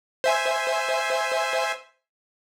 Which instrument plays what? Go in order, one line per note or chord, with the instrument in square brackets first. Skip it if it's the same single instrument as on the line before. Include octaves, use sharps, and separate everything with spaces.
[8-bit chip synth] C5 E5 G#5